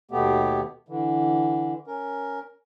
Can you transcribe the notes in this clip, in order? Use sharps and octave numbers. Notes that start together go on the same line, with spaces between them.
D#2 B2 A3 B3 G4
D3 E3
C#4 A#4